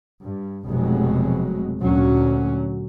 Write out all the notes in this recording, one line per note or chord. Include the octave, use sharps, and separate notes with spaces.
G2
F1 B2 F#3 G#3
D2 A#2 F#3 C#4